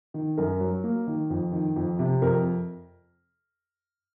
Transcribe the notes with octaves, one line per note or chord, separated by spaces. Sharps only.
D#3
F#2 A#4
F#3
A#3
D#3
F2
D#3
F2
C3
F2 A#4